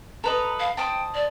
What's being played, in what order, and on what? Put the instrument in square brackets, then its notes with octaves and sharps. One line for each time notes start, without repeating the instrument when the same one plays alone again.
[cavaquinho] A4 B4 D#5 [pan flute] A#5
[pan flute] F5
[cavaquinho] C5 D#5 A5 [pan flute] G5
[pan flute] D5